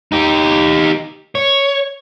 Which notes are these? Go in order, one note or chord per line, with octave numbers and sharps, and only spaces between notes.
D#4 G4
C#5